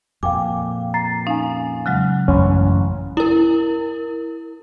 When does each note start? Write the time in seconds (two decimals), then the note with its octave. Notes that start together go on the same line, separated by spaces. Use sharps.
0.23 F2 A#2 F5 G5 G#5 D6
0.94 A#5 A6 C7
1.27 C#4 D#4 F5 G#5
1.86 C#3 F#3 G#3 F#5 F#6
2.28 A1 F#2 E3 C#4
3.17 E4 A#4